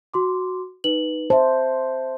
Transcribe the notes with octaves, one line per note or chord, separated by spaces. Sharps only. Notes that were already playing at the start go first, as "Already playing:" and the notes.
F#4 C6 D6
D#4 B4 F#7
C5 E5 A5